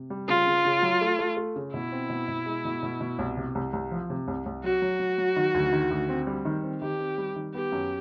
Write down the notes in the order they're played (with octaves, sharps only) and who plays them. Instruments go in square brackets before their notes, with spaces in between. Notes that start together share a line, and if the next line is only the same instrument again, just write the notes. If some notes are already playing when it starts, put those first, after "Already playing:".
Already playing: [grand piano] C3
G3
[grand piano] C#3 [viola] F4
[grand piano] C#3
C#3
F#3
A3
A3
A3
C#3
[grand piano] B2 [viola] E4
[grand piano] C4
B2
B2
G#3
B2
B2
B2
C2
C3
C2
C2
F3
C3
C2
C2
[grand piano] F#3 [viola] F#4
[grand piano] F#3
F#3
F#3
D#3
D2
D#3
D2
C4
G3
D#3
C4
[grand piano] D#3 [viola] G4
[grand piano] C4
G3
D#3
[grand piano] B3 [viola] G4
[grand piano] F#2